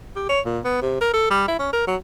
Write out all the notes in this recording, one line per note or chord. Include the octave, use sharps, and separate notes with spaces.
G4
C#5
A#2
B3
C3
A#4
A4
G3
E4
C#4
A#4
F#3